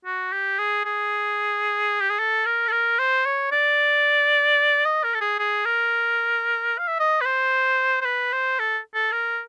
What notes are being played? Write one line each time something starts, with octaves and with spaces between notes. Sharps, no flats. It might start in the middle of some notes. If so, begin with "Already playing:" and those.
F#4
G4
G#4
G#4
G4
G#4
A4
A#4
A4
A#4
C5
C#5
D5
D#5
A#4
A4
G#4
G#4
A#4
F5
E5
D#5
B4
C5
C5
B4
C5
A4
A4
A#4